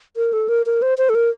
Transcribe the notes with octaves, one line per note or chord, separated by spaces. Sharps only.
A#4
A4
A#4
A#4
C5
C5
A4
A#4